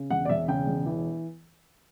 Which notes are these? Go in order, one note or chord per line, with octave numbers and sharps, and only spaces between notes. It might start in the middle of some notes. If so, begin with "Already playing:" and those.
Already playing: C#3
E1 F#5
D5
E1 E5
C#3 G5
E1
E3